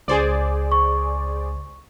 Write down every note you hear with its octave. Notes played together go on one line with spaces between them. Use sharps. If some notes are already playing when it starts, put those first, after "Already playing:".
C#2 G#4 C5 D5
C#6